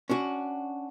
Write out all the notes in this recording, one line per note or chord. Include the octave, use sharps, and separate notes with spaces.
C#4 D4 F#4